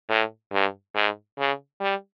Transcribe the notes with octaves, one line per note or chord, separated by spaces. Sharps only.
A2
G2
G#2
C#3
G3